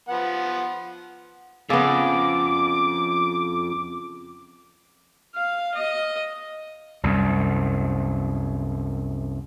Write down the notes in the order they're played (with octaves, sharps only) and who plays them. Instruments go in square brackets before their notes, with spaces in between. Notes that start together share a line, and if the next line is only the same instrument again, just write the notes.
[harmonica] F3 B3 F#5
[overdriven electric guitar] F2 [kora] C#3 B3 [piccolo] D6
[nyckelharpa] F5
D#5
[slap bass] C2 F#2